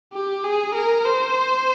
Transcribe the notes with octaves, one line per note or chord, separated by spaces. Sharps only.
G4
G#4
A#4
C5